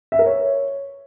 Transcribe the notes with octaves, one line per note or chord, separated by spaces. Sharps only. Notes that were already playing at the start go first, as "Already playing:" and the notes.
E5
A#4
C#5